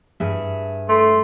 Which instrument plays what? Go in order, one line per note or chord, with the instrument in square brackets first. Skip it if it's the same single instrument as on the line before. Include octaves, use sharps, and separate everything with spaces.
[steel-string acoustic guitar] G2 G#4 E5
[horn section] A3 C6